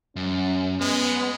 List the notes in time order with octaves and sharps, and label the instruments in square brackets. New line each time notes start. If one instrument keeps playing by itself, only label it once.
[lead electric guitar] F#2 [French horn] C#4
[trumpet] G#3 [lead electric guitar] B3